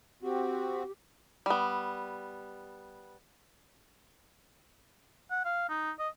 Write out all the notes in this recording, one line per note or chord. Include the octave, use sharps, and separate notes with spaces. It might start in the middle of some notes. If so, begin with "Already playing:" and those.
C4 F#4 G4
G3 B3
F#5
F5
D#4
D#5